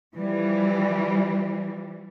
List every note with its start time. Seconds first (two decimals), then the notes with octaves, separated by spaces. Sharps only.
0.17 E3 F3 G3